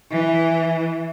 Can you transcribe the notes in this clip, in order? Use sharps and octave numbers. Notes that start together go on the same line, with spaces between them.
E3